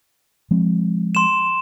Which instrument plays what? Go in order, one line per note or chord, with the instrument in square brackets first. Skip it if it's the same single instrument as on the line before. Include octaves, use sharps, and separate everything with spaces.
[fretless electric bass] F3 G#3 C4
[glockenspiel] C6 E7